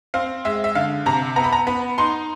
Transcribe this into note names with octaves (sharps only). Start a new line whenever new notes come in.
C4 F5
G#3 E5
E5
D3 F5
C3 A#5
B3 A#5
B5
A#5
B3 B5
D#4 C6